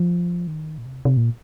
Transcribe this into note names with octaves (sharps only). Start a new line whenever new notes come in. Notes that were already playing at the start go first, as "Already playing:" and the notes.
Already playing: F3
D#3
A#2
C3
C3
A#2